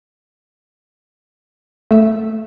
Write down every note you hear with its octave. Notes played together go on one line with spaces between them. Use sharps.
A3 E5